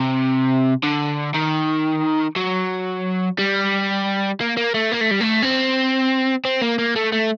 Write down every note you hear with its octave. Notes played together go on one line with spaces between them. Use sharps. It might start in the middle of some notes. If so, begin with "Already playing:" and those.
Already playing: C3
D3
D#3
F#3
G3
A#3
A#3
A3
A#3
A3
G3
A3
C4
C4
A#3
A#3
A3
A3